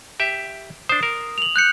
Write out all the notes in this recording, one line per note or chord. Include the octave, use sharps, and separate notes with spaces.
G4 E5
D4 C5 D#6
A#4
F7 F#7
F#6 G6 C#7